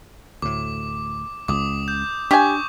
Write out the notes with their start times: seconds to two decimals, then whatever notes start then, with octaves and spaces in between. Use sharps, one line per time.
0.42 D2 A2 D6
1.48 C#2 D6 D#6
1.88 G6
2.31 D4 G4 G#5 C#6 D6 G6